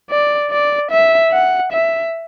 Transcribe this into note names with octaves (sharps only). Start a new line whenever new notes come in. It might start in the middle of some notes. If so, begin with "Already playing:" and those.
D5
D5
E5
F#5
E5